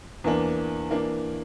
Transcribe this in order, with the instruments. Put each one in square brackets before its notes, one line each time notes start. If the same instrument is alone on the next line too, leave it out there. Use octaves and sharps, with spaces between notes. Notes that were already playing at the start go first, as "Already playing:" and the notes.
[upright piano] E2 E3 A#3 D4
E3 A#3 D4